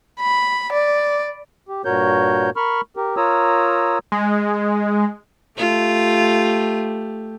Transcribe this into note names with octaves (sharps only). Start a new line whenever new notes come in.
B5
D5
G4
G2 A#2 F#4 A#4 C#5 G6
A#4 B5 C#6 F6
G4 A#4
F4 A#4 C#5 A#5 D#6 E6
G#3
A3 F4 G4